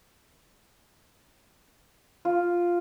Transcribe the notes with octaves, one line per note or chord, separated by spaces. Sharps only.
F4